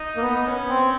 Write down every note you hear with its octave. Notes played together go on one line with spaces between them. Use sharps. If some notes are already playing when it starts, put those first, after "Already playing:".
Already playing: D#4
A#3
B3
B3 C#4
C4